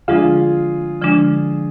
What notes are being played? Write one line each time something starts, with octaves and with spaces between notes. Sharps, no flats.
D3 F3 G#3 D4 F4 G#4
D3 F3 G#3 D4